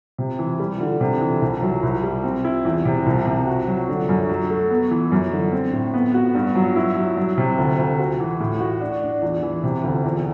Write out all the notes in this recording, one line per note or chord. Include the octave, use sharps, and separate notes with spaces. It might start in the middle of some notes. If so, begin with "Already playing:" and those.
C3
E3
G3
D3
C3
E3
C2
F#3
C2
G3
C4
E4
E2
C3
C2
C3
F#4
F#3
D3
F#2
F#3
A3
B3
E3
F#2
D3
C4
A2
B3
F#4
G2
F#3
E4
F#3
F#3
C3
D2
D2
F#4
E3
A2
F#4
D4
D4
E2
E3
C3
D2
E2